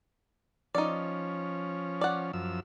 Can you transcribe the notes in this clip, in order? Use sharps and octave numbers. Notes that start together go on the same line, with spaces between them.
F3 C#4 D#4 D5
D5 F#5
F#2 F3 E6